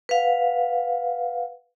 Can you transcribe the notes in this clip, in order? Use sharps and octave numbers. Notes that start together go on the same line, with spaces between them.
B4 F5 F#5